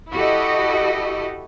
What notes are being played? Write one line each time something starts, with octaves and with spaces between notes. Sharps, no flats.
E4 F#4 G4 A4 D#5